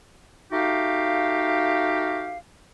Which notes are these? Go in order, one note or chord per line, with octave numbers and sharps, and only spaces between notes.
A3 D#4 F#4 G4 F5